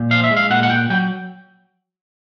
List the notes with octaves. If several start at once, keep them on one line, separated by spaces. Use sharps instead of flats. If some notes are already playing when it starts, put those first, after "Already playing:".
Already playing: A#2
F3 F5
E5
G#3
F5
A#2 F#5
F#5
A#2 G5
F#3 G5